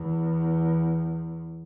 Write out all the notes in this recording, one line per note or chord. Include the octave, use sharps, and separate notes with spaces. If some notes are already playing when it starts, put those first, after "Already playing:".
Already playing: E2